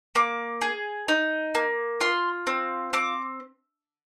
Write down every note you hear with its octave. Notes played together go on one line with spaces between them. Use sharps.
A#3 D6
G#4
D#4
A#3
F4 C6
C4
C4 D6